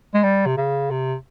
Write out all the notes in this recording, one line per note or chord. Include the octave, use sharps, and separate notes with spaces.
G#3
G3
C3
C#3
C3